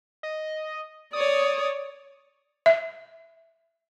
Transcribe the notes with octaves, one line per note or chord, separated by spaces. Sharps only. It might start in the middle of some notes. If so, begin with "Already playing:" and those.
D#5
C#5 D5 D#6
E5